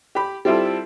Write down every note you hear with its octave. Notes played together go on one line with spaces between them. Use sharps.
G4 B5
G3 C4 E4 F4 A4